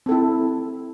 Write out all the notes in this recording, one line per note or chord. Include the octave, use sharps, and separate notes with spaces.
C4 E4 A4